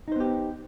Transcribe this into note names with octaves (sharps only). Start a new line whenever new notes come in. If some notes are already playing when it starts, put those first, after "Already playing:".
B3 D#4 G4 C5